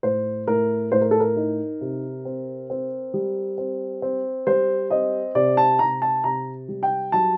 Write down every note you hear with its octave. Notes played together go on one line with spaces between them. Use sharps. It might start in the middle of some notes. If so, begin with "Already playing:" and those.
A2 C5
A2 A#4
A2 C5
A#4
A4
A#4
D#4
C3
C4
C4
G3
C4
C4
G3 C5
C4 D#5
C3 D5
A5
C3 A#5
A5
C3 A#5
G3
G5
F#3 A5